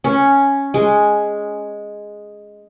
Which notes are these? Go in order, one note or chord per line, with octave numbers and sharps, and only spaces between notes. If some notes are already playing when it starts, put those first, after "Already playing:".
C#4
G#3